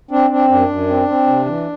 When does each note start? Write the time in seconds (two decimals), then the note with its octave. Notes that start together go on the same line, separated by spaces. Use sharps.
0.11 C4 D4
0.30 C4 D4
0.49 F#2 D4
0.69 F#2
0.88 C4
1.08 C4
1.27 C3
1.46 E3